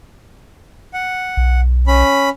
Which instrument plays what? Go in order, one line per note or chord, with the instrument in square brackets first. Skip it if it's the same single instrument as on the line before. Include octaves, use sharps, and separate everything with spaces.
[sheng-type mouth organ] F#5
[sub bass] B1
[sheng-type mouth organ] C#4 B5